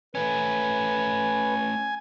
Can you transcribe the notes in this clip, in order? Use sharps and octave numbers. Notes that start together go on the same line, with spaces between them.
A3 C#4 B4 G#5